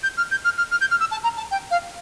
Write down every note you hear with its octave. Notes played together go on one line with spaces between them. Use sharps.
G6
F6
G6
F6
F6
F6
G6
F6
E6
A5
A#5
A5
G5
F5